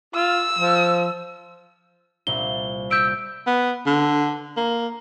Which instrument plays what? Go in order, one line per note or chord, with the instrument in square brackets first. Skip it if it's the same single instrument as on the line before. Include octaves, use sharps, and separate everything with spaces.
[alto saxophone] F4 [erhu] E6
[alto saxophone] F3
[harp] C2 A#2 [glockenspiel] G7
[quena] E6 [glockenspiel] G6 D7
[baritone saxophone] B3
D3
A#3